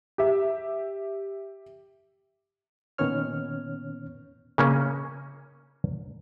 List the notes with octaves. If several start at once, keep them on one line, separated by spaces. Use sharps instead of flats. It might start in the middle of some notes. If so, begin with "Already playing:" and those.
G4 E5
A#2 D#3 B3 C#4 C#5 F6
C#3 A#3 C#4